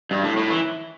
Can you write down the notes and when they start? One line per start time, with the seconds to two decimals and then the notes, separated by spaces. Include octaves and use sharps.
0.11 G2
0.23 A2
0.37 A2
0.50 E3